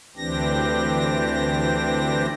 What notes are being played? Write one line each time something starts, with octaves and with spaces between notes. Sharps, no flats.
D2 E3 C4 D4 G4 A#6